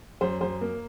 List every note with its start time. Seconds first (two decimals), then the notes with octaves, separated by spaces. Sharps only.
0.21 F#2 C5
0.41 F#2 C5
0.61 A#3 A#4